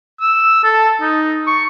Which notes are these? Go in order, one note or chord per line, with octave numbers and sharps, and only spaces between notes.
E6
A4
D#4
C#6